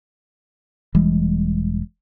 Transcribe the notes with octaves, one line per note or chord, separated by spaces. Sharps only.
E1 E3 G3 G#3